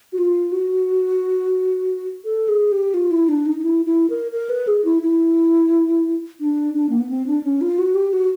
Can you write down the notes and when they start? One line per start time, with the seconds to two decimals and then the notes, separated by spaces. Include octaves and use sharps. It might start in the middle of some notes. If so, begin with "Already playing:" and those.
0.13 F#4
0.18 F4
0.52 F#4
2.25 A4
2.48 G#4
2.72 G4
2.94 F4
3.11 E4
3.28 D4
3.46 D#4
3.58 D#4
3.63 E4
3.86 E4
4.10 A#4
4.32 A#4
4.49 B4
4.67 G#4
4.85 E4
5.02 E4
6.40 D4
6.74 D4
6.89 A#3
6.99 B3
7.09 C4
7.27 D4
7.43 C#4
7.61 F4
7.79 F#4
7.95 G4
8.13 F#4